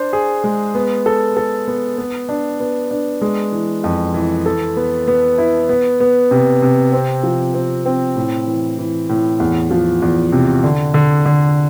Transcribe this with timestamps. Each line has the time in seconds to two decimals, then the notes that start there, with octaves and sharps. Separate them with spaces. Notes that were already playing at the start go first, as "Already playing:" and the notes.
Already playing: D4 C5
0.13 G#4
0.44 G#3
0.75 B3
1.06 A4
1.37 A4
1.68 B3
1.98 B3
2.29 D4
2.60 B3
2.91 D4
3.21 G#3
3.52 E3
3.84 F2
4.14 E3
4.46 A4
4.77 B3
5.08 B3
5.38 E4
5.69 B3
6.00 B3
6.31 C3
6.62 C3
6.93 C4
7.23 F3
7.54 C4
7.86 C4
8.16 A2
8.47 E3
8.78 E3
9.09 A2
9.40 E2
9.71 F3
10.02 E2
10.32 C3
10.64 D3
10.94 D3
11.26 D3